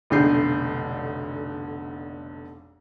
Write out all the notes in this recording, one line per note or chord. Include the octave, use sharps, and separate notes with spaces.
F1 B1 D3 G6 C7